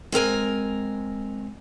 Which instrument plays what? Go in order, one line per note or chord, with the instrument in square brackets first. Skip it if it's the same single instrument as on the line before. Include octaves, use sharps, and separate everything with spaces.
[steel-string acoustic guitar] G#3 C4 A#4 G#5